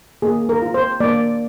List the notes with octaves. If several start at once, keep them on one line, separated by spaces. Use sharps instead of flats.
A#3 G#4
A#4
F4
C5
A#3 D5